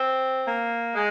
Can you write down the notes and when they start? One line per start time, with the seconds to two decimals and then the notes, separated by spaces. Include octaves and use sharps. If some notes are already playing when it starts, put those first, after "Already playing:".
Already playing: C4
0.47 A#3
0.95 G#3